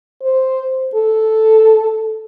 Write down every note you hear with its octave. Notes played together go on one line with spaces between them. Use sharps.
C5
A4